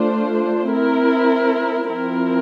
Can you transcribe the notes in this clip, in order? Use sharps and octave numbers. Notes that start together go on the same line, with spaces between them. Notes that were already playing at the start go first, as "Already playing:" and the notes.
Already playing: A3 D4 F4 C5
C4 E4 A#4
F3 C4 E4 A#4